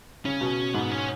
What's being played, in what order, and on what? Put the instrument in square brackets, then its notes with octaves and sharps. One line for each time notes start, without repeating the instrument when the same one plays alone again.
[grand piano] C#3 [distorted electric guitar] C#4
[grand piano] B2
[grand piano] G#2 [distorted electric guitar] B3
[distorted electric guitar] C#4